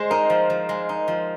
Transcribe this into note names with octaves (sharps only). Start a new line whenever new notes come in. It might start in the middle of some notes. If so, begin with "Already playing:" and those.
Already playing: G#3 C5
D#4 A#4
F3
F3
G#3
D#4
F3